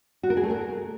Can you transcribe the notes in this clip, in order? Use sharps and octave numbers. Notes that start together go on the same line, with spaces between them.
F#4
A#4
G#4
A3
A#4